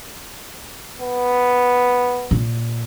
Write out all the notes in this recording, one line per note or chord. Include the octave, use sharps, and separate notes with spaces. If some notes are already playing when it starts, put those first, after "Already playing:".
B3
A#2